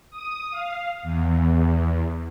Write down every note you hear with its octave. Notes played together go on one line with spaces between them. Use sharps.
D#6
F5
E2